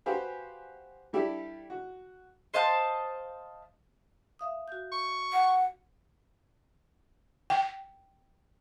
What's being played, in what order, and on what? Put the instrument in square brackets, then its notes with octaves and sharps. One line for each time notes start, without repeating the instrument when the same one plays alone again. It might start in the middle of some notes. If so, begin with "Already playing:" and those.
[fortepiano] F#4 G4 B4 C5 F5 G#5
G3 D4 E4 G4 A4 D5
F#4
[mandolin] C5 D#5 F5 A5
[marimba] E5 F5 D#6
F#4 G6
[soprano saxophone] C#6
[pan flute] F#5
[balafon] G5